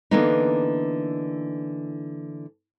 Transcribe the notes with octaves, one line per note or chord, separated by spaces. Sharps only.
D3 E3 A#3 B3 D4 D#4